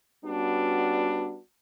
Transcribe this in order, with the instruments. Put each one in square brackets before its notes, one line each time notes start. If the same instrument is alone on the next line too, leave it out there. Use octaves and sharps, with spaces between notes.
[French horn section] G3 B3 C#4 D4 F#4